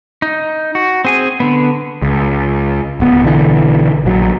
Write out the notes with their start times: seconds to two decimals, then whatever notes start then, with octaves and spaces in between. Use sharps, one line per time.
0.22 D#4
0.75 F#4
1.05 C4 G#4 G#5
1.40 D3 B3
2.02 C#2
3.00 D1 B3
3.23 B1 D3 E3
4.05 A#1 F#3